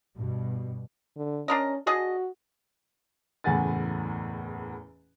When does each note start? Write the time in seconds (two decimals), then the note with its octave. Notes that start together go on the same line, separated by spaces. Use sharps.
0.16 G2 B2
1.17 D3
1.48 C#4 D4 A#4 D#5
1.87 D4 F#4 G#4 D#5
3.44 F#1 E2 A2 F#5 G#5 A6